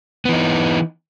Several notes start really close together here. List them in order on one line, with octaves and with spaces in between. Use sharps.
B3 E3 D#4